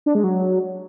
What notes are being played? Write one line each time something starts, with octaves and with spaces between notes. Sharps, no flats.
D4
G#3
F#3